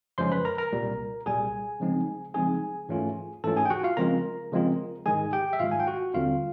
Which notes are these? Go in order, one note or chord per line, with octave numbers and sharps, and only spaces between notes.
F#2 C#3 F3 G#3 C#4 C5 C6
B4 B5
A#4 A#5
A#4 A#5
C2 A#2 G3
C2 A#2 G3 G#4 G#5
C#3 F3 G#3 C4 D#4
C#3 F3 G#3 C4 D#4 G#4 G#5
G#2 E3 A3 C#4 F4
G#2 E3 A3 C#4 F4 A4 A5
G#4 G#5
G5
F#4 F#5
F4 F5
C#3 F3 G#3 C4 F4 A#4 A#5
C#3 F3 G#3 C4 F4
G#2 D#3 G#3 G#4 G#5
G4 G5
E5
G#2 D#3 G#3 F4 F5
G#5
G5
F#4 F#5
D#2 D3 G3 C4 F4 F5